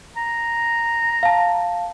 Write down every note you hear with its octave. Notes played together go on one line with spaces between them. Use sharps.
A#5
F5 A5